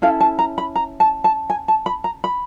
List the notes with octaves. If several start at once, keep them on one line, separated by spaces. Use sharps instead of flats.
C#4 E4 A4 F5
A5
A#5
B5
A#5
A5
A5
G#5
A5
B5
A#5
B5